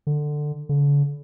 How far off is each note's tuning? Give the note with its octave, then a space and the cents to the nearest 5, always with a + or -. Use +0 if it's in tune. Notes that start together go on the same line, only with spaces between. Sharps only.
D3 +15
D3 -45